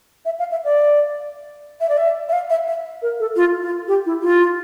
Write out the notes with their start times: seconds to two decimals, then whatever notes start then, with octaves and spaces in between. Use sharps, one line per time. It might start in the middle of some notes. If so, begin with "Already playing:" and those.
0.25 E5
0.39 F5
0.51 E5
0.64 D5
1.81 E5
1.89 D5
1.97 E5
2.29 E5
2.33 F5
2.50 E5
2.68 E5
3.02 A#4
3.20 A4
3.36 F4
3.62 F4
3.88 G4
4.06 E4
4.22 F4